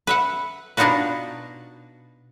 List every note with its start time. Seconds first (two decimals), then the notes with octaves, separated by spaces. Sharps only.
0.07 B4 E5 F#5
0.77 B2 D4 D#4 F4 F#4 B4